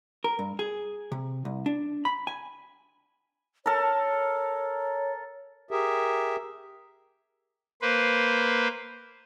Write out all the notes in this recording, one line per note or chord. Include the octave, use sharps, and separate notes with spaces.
A#4
G2
G#4
C3
C2
D4
B5
G#5
A4 A#4 C#5
G4 G#4 A#4 E5
A#3 B4 C5